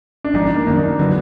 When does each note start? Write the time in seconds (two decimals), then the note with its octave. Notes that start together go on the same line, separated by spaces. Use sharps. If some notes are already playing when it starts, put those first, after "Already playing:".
0.24 D4
0.34 G#1 G#2 F3 D#4
0.45 D4
0.56 A#3
0.66 F#2 D#3 A#3 D4
0.78 D#4
0.88 A#3
0.99 D3 F#3 B3